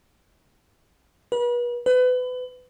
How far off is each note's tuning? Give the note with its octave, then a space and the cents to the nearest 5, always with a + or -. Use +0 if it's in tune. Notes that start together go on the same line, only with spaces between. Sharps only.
B4 -35
B4 +30